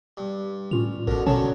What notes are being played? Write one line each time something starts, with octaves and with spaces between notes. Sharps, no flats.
G2
A2 C#4 F4 F7
A1 B2 D3 A#4
B2 D3 D#3 F#3 C#4 C#5 A5